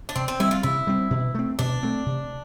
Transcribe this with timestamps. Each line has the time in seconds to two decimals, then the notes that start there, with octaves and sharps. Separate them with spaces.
0.09 D4
0.16 C3 C4
0.28 C4
0.40 G3 C4 E4
0.51 F4
0.63 C3 E4
0.87 G3 C4
1.11 B2
1.35 A3 C4
1.59 B2 D4
1.83 A3 C4
2.06 C3